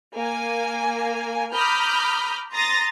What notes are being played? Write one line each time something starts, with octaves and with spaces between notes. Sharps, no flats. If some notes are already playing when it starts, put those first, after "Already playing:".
A#3 G#5
A#5 B5 D6 D#6 F6 G6
A#5 C6 D#6 A6 A#6